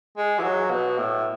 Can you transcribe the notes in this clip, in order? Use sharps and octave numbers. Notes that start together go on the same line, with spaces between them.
G#3
E3
F#3
B2
A2